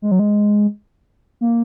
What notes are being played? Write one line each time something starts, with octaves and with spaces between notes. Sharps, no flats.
G#3
F#3
G#3
A#3